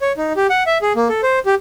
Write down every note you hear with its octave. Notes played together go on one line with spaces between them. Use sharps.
C#5
D#4
G4
F#5
E5
G#4
A#3
A4
C5
G4